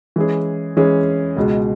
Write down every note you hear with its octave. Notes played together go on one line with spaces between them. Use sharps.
E3 G#3 C#4 G#4
E3 G#3 C#4 G#4
C#2 B2 G#3